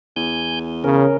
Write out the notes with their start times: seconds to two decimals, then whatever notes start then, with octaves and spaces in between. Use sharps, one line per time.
0.16 E2 G#5 G6
0.84 C#3 C#4 A#4